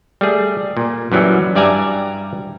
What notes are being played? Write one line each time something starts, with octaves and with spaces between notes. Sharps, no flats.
G3 A3 G#4
A#2
F#2 E3 F#3 G3
G2 G3 D5 E5 G#5 A#5